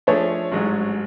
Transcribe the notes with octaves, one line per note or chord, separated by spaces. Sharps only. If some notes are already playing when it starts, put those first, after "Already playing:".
F3 A3 D4 G#4 C#5
A1 G#2 F#3 C#4 G#4